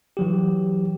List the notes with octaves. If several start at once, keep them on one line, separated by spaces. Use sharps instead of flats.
E3 F#3 G4